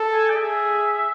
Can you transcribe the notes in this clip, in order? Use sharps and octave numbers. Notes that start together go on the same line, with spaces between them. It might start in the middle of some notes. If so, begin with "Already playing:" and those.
Already playing: A4
G#5
D5
G#4 E5